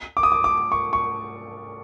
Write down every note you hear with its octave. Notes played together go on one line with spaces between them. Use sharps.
D6
D#6
D6
D6
C#6
C#6